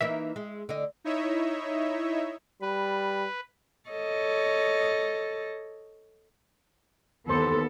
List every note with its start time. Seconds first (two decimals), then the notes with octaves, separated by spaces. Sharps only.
0.01 E3 A#3 D#4 E5
0.36 G#3
0.69 D3 D#5
1.04 D#4 E4 C#5 D#5 E5
2.62 G3 B4
3.90 A4 C#5 D#5
7.27 D#2 E3 B3 A4 C5